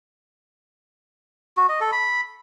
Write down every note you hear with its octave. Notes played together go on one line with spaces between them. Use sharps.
F#4
D#5
A4
B5